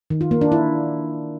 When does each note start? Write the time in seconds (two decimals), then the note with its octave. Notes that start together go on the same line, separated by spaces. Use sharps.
0.10 D#3
0.21 F4
0.31 A#3
0.41 D4
0.52 E4